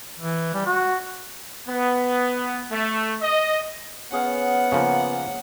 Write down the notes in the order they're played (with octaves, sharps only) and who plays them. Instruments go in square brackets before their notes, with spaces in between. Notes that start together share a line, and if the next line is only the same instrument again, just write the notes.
[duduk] E3
G3
F#4
[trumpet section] B3
A3
D#5
[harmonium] B3 [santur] C#4 G#4 F5 [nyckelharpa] F#5
[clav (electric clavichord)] C#3 F3 [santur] A#3